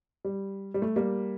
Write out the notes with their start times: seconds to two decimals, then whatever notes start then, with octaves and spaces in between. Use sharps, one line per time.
0.25 G3
0.74 G3
0.82 A3
0.96 G3 A#3